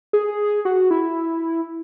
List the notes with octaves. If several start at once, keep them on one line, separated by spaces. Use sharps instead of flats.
G#4
F#4
E4